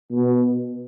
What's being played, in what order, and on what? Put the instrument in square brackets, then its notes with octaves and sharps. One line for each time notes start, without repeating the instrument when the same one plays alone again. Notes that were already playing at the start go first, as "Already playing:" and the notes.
[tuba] B2